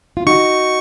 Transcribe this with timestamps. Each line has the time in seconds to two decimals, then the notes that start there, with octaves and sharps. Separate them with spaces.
0.17 F4
0.26 D#4 F#4 C#6